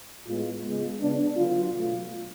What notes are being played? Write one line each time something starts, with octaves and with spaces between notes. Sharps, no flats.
A2 G#3 B3 F4
C#3 G#3 B3
C#3 G#3 B3 D4
D3 F#3 B3 F4
B2 F#3 A3